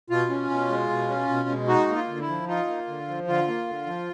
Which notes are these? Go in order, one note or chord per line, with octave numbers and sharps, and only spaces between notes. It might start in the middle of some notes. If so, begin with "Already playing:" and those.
B2 F4
C#4
B2
G#3
B2
C#4
B2
G#3
D#4 F#4
A#3
F4
D3
E4
F3
D#4 F4
A#3
D3
F3
D3 F4
A#3
D3
F3